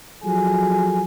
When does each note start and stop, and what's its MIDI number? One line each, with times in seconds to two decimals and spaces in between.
0.23 1.04 53
0.23 1.04 54
0.23 1.04 68
0.23 1.04 69
0.23 1.04 80